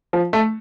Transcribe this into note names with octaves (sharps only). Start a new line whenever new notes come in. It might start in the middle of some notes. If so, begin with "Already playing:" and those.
F3
A3